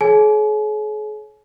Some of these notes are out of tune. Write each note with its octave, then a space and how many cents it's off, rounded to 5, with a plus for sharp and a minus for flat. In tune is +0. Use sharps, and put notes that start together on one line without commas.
G#4 +40 C#5 +0 G#5 +40